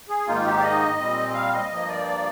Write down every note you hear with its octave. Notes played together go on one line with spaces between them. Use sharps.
G#4
G#2 D#3 A#3 D#4 F4
G4
D5
D#5
A#2 G3 C4
D#5
F5
D#5
G2 F3 A#3 D#5
D5